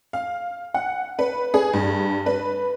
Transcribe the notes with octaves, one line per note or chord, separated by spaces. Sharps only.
F5
F#5
B4
G#4
G2
B4